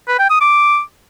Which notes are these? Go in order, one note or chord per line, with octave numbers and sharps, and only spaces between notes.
B4
G5
D#6
D6